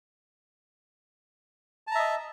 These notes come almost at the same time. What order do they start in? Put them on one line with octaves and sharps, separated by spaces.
A5 A#5 E5 D#5